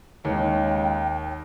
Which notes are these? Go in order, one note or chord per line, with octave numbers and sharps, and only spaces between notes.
D#2 C#3 G#3 C#5 G5